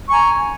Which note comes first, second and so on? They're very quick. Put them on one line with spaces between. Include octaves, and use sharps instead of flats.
C#6 G#5 A#5